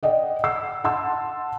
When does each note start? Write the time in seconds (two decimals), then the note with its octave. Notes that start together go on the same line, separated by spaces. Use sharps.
0.03 D5 D#5 F#5 G5
0.44 F#5 E6 C7
0.84 F#5 A5 C6 E6